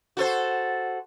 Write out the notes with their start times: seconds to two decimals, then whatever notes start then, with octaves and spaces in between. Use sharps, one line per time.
0.17 F#4 A4 C5